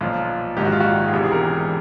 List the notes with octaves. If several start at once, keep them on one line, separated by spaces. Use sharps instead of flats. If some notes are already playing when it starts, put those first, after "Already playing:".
B1 A#2 F3 F4
A#1 G#2 D#3 G4
F#4
F4
F#4
G#4
E1 E2 C3 G4
G#4
A#4